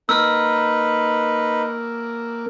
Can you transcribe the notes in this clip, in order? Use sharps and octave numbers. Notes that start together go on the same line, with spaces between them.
A#3 D#4 B4 E6 F6